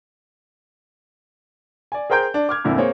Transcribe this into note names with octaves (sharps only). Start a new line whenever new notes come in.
D5 G#5
G#4 A#4 C5 G5 A#5 G6
D4
D6 F6 G#6
F2 A#2 D3 E4
A#3 C4 G#4 C#5